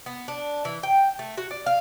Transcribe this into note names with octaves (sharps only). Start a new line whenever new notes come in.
B3
D4
E3
G5
A3
F#4
D5
F5